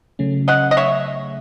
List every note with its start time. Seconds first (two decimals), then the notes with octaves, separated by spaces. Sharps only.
0.19 C#3 F#3 A3 C#4
0.48 D#5 F#5
0.71 D#5
0.77 C#5 E5